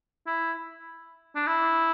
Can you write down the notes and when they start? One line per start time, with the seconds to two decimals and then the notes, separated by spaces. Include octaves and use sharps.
0.27 E4
1.36 D4
1.47 E4